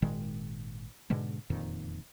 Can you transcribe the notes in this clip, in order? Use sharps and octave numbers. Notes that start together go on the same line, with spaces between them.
G#1 A#2 D#3 G#3
G#2 B2 D3 G#3
E1 F2 A#2 D#3